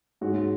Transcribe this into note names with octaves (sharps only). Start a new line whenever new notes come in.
G#2 G#3 C#4 F#4